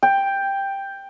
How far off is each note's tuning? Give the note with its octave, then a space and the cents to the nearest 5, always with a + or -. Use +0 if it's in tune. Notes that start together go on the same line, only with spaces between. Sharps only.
G5 +5